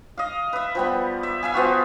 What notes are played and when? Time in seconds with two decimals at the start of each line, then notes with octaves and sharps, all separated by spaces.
0.18 D#5 F5
0.53 B4 E5
0.75 F3 G3 B3
1.23 E5
1.43 E5 F5 G#5
1.54 F3 B3 F4 F#4